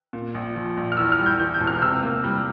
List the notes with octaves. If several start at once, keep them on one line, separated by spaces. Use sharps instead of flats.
A#2
A#1
F3
A#1
F6
E2 E6
F6
G3
G6
E3 G6
G6
E1
F6
C3 E6
A#3
G3